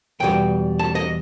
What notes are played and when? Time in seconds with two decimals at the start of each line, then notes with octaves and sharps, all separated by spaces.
0.20 E2 B2 G3 G5
0.79 A5
0.95 D#5